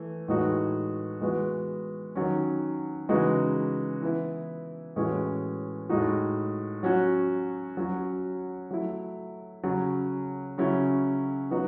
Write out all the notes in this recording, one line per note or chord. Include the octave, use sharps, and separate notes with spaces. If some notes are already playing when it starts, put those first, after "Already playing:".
Already playing: E3 A3
A2 E3 G#3 D#4 F#4
E3 G#3 B3 F#4
D#3 F#3 C#4
C#3 E3 G#3 D#4 F#4
E3 B3 E4
A2 E3 G#3 C#4 F#4
A2 G#3 D#4 F#4
F#3 C#4 F#4
F#3 C#4 F#4
F#3 A3 E4
C#3 F#3 C#4
C#3 F#3 C#4 E4
F#3 B3 D#4 F#4